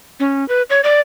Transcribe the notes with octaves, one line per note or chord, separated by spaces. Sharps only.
C#4
B4
C#5
D5